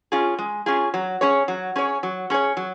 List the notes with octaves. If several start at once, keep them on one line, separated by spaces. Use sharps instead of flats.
C#4 F4 G#4
G#3
C#4 F4 G#4
F#3
C#4 G#4 C#5
F#3
C#4 G#4 C#5
F#3
C#4 G#4 C#5
F#3